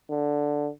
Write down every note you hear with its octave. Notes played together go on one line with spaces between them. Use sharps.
D3